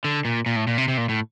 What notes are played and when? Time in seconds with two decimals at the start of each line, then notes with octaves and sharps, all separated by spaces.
0.04 D3
0.25 A#2
0.46 A#2
0.56 A2
0.67 A#2
0.78 C3
0.88 C3
0.98 A#2
1.09 A2